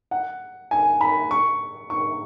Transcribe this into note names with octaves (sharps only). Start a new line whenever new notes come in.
F#5
G#5
B5
C#6
C#6